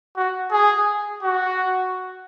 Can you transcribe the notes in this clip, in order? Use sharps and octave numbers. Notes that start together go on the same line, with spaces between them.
F#4
G#4
F#4